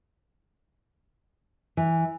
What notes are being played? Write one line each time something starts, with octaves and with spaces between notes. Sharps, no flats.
E3